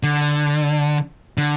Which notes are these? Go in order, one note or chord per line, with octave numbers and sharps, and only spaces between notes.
D3
D3